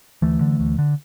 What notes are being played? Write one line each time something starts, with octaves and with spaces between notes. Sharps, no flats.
D2 E3 A3
D3
D2
D3